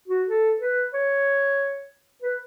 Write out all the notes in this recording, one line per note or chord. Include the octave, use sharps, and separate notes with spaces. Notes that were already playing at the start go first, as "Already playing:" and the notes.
F#4
A4
B4
C#5
B4